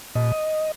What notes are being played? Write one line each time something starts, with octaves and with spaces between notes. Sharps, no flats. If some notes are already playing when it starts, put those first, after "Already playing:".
A#2 D#5